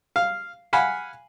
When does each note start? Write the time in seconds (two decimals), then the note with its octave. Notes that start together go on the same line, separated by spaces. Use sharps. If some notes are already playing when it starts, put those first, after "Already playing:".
0.16 F5
0.73 F5 F#5 G#5 B5